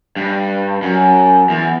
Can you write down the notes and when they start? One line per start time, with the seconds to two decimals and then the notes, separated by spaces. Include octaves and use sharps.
0.16 G2
0.82 F#2
1.49 E2